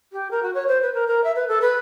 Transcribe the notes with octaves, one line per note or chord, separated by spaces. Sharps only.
G4
A#4
F#4
C#5
C5
B4
A#4
A#4
E5
B4
A4
B4